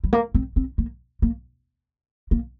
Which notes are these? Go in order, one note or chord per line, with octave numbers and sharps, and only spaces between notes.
G3
A#3
C4
C4
A#3
A#3
A#3